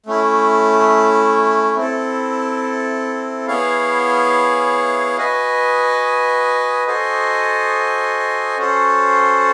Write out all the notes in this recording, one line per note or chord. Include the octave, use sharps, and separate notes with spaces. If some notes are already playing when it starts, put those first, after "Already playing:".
A3 C#4 E4
C4 E4 A4
B3 E4 G#4 C#5 F5
F#4 B4 D#5 G#5
F#4 A4 C5 D#5 G#5
C#4 F#4 A4 C5